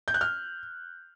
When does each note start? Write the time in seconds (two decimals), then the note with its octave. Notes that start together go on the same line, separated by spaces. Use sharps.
0.08 G6
0.14 F#6
0.21 F6